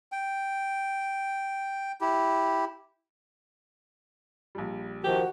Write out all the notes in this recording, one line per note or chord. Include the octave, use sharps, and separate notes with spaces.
G5
E4 G4
A#1 G3
D#3 F3 F#4 G4